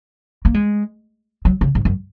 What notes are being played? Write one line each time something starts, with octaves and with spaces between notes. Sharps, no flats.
A#3
G#3
F#3
C#3
G#2
F#2